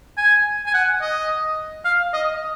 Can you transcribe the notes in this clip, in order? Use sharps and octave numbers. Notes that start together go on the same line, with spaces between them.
G#5
G#5
F#5
D#5
F5
D#5